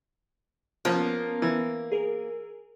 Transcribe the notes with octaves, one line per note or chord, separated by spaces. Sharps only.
F3 A#3 B3 C#4
E3
G#4 A#4